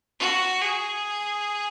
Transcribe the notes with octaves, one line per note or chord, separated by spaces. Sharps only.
F#4
G#4